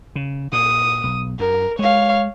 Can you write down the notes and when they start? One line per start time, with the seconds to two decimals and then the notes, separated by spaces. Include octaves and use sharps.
0.15 C#3
0.52 A#2 D#6
1.04 B1
1.39 F#2 A#4
1.79 G#3 C#5 F5